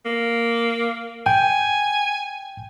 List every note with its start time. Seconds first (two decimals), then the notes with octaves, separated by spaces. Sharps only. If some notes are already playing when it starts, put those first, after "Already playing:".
0.06 A#3
1.26 G5 G#5